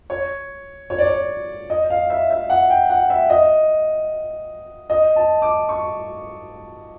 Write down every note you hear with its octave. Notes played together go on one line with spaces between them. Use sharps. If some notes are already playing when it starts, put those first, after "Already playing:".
C#5
C#5
D5
C#5
D#5
F5
E5
E5
F#5
G5
F#5
E5
D#5
D#5
A5
D6
C#6